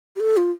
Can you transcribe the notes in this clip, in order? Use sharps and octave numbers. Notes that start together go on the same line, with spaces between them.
G4
A4
F4